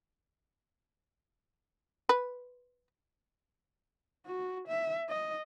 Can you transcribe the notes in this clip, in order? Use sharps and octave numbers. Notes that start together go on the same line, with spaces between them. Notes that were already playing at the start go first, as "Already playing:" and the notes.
B4
F#4
E5
D#5